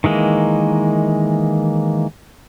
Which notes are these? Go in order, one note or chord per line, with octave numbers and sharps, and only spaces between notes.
D#3 E3 G#3 A#3